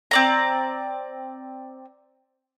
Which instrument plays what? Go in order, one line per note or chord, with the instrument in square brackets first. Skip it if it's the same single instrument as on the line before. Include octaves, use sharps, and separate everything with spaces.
[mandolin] C4 D5 A#5